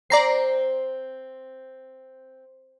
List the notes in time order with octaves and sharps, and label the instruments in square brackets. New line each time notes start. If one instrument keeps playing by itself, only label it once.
[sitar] C4 [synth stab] D5 A#5 C7